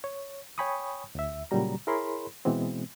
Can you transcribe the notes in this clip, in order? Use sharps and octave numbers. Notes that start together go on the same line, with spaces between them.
C#5
C#5 G5 G#5 B5 C#6 D#6
D2 E5
A#2 C#3 F#3 G3 A#5
E4 G#4 A#4 C#5 B5 C6
B2 E3 G#3 B3 C4